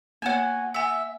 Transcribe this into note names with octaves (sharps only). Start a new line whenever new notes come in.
A#3 B3 F#4 C#5 G#5
E5 F#5 G#5